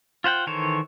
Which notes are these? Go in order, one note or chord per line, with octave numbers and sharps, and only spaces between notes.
F4 C5 F#5 G5
D#3 E3 A4 C5 C#5